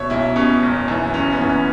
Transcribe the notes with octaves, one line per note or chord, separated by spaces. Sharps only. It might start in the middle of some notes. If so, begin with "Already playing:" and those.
Already playing: B2 C#5 E5
B1 E4
B2 C#4
F#1
F#2 E3
F#1 C#4
B3
F#2 E3
C#4